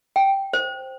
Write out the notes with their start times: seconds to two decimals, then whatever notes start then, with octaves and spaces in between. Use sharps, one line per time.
0.16 G5
0.53 C5